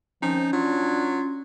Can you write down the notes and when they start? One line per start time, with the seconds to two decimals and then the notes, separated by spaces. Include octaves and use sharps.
0.22 D#2 D3 F3 C4 C#4 D#4
0.53 F#3 D4 F4